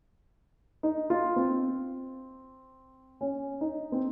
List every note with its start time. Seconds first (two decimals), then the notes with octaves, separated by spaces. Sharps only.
0.83 D#4
1.10 F4
1.36 C4
3.21 C#4
3.61 D#4
3.92 C4